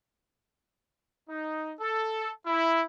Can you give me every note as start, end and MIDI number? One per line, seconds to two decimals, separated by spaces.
1.30 1.74 63
1.80 2.32 69
2.47 2.84 64